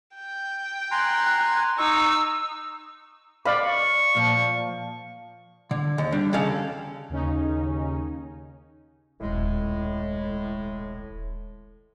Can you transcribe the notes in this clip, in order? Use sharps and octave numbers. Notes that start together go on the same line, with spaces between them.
G5
G#5 A#5 C6 F#6
D#4 C#6 E6
D5 D#5 F5 B5 C#6
A#2 F3
D3
D#2
G3 D4
D#2 C#3 A4 F5
D#2 C#3 C#4 D#4
D#1 B1 A2 G#3